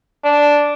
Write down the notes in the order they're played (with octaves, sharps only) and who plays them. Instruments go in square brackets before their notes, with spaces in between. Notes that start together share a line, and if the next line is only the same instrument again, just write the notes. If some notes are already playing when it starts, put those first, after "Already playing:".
[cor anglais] D4